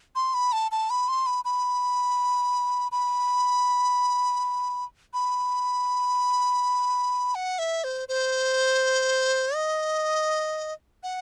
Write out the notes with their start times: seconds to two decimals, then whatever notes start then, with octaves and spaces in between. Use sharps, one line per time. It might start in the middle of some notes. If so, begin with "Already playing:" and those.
0.15 C6
0.34 B5
0.52 A5
0.71 A5
0.90 B5
1.08 C6
1.26 B5
1.45 B5
2.92 B5
5.13 B5
7.35 F#5
7.58 E5
7.84 C5
8.08 C5
9.55 D#5
11.03 F#5